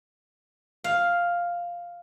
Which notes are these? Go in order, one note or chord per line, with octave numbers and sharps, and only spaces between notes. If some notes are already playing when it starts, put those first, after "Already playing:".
F5